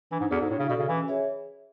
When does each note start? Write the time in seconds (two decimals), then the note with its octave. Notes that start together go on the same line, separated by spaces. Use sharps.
0.11 E3 D4
0.20 G#2
0.30 E2 F#4 A4 D5
0.41 G#2
0.49 A2 D4
0.59 C#3
0.69 B2 F#4 A4 D5
0.79 C#3
0.88 E3 C#4
1.08 G#4 C#5 E5